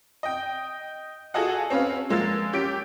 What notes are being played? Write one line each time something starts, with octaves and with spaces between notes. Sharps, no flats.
D#5 G5
F4 F#4 G#4 A4 D#5 F#5
C4 C#4 B4 F5
F3 G#3 A#3 E6 A6
C#4 G4 B6 D7